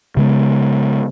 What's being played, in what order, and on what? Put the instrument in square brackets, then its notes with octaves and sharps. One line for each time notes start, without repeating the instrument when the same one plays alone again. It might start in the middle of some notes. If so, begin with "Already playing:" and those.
[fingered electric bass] C#3 G#3 B3